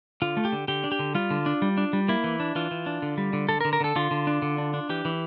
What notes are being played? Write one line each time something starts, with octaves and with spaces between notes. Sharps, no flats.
D3 F4
A3
G4
D3
D3 G4
D4
G4
D3
G3 F4
D3
D4
G3
D4
G3
A#3 E4
E3
D4
E3 F4
E3
D4
D3
G3
D3
D3 A4
A#4
D3
A#4
D3 A4
D3 F4
D3
D4
D3
D4
D4
E3 G4
E3